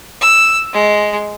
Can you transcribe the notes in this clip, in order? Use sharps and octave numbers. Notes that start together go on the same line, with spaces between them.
E6
G#3